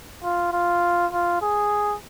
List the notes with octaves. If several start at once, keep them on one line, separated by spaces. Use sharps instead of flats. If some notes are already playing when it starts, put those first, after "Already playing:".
F4
F4
F4
G#4